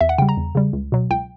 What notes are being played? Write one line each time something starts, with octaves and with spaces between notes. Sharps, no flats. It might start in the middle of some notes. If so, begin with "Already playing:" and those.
E2 E5
F#5
C#3 G3 G5
A#5
E2
C#3 G3
C#2
B2 F#3
C#2 G5